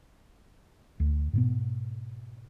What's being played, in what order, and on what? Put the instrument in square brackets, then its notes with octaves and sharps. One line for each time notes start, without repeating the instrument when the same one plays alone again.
[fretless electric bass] D2
G#2 B2 B3